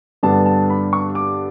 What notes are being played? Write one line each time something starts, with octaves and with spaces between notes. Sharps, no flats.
G2 D3 G3 B3 D4 A5
A5
B5
C#6
D6